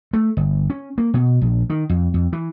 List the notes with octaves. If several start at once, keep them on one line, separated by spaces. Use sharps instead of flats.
A3
G1
C#4
A#3
B2
A#1
D#3
F2
F2
E3